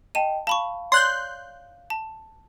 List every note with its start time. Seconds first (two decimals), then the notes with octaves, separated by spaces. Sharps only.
0.15 D#5 G5 A5 D#7
0.47 F5 A5 B5 C#6
0.92 C#5 D5 C6 F#6 G6
1.90 A5